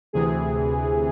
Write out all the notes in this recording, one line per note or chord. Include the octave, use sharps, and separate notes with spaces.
D2 C3 E3 G#4